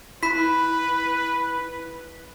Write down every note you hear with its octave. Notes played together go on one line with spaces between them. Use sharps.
E4 B4 B5 B6